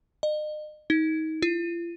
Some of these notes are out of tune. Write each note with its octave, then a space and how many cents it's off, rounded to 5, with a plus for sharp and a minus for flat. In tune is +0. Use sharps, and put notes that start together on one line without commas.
D#5 -40
D#4 +25
F4 -40